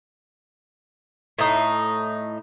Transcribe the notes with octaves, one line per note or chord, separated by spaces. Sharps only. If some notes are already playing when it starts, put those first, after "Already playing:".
A2 D#4